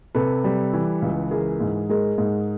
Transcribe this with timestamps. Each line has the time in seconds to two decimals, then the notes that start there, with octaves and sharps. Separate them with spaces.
0.15 C3 A4 B4
0.44 G3
0.73 E3
1.02 C#2
1.31 E3 G#4 A#4
1.60 G#2
1.89 G#3 G#4 A#4
2.18 G#2